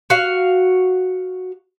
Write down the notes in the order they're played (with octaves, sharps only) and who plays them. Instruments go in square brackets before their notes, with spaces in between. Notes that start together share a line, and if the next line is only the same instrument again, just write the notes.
[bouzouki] F#4 F5